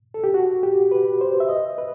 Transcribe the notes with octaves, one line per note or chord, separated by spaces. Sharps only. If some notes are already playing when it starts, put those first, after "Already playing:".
A4
G4
F#4
G4
B4
C5
E5
D#5
B4